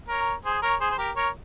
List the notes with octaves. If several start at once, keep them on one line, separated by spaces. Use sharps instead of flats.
A#4 C#5
G#4 C5
A#4 C#5
G#4 C5
C5
G4 A#4
A#4 C#5